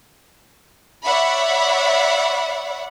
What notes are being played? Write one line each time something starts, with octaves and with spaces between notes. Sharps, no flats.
C#5 D5 E5 F#5 B5